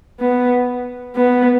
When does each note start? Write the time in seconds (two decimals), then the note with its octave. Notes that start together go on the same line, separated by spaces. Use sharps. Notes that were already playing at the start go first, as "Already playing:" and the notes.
0.20 B3
1.16 B3